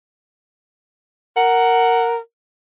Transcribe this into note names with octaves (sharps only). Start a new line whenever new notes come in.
A#4 F#5